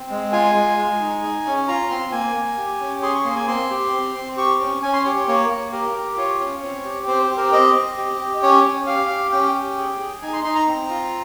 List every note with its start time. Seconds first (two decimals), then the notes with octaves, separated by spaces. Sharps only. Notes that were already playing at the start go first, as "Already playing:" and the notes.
Already playing: C4
0.10 G#3
0.32 F4 G#5
0.55 G#3
0.78 G#3
1.01 D#4
1.23 G#4
1.46 C#4
1.68 F4 A#5
1.90 C4 C6
2.12 A#3 G#5
2.36 A#3
2.57 G4
2.80 C#4
3.02 G#4 C6
3.14 C#6
3.24 A#3 C6
3.36 G#5
3.48 C4 C6
3.70 G4
3.93 C4
4.15 C4
4.37 G4 C#6
4.61 C#4
4.83 C#4 G#5
4.93 C6
5.04 G4 C#5
5.16 C#5
5.28 A#3 C#5
5.50 A#3
5.72 G4 A#4
5.95 G4
6.17 F4 C#5
6.40 C#4
6.63 C4
6.85 G4
7.07 C4 C5
7.23 C5
7.30 G4
7.37 A#4
7.52 C4 D#5
7.74 C4
7.97 G4
8.20 G4
8.42 C#4 C#5
8.64 C#4
8.87 G4 F5
9.09 G4
9.32 C#4 G5
9.54 G4
9.78 G#4
10.00 G#4
10.22 D#4 G#5
10.33 C6
10.44 D#4 C6
10.56 A#5
10.68 C4
10.89 F4